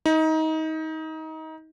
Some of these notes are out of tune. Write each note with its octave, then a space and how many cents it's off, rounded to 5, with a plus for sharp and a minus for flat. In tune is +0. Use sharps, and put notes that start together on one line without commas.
D#4 +25